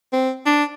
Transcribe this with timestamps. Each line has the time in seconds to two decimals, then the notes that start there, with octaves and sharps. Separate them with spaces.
0.13 C4
0.46 D4